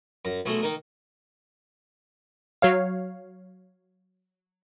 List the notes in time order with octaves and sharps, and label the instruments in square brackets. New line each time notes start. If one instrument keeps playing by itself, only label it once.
[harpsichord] F#2 A#5
B1 A3 F#4 G#4 A4 C6
D#3 A#3 D#4 A#4
[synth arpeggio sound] F#3 C#5 F5